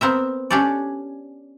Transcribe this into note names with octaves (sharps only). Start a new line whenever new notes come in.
B3 C4 A#4 E5
C#4 D4 G4 A4 D5